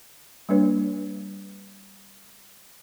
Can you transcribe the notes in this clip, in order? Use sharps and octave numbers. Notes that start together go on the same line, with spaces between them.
G3 A#3 D4 B4 C#5